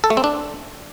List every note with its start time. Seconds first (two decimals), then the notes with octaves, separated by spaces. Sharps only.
0.04 A4
0.10 A3
0.17 C4
0.24 D4